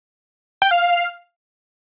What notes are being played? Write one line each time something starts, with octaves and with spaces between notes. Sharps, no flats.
G5
F5